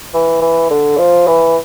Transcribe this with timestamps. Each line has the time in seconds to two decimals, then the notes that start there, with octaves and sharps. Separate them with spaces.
0.14 E3
0.42 E3
0.70 D3
0.98 F3
1.27 E3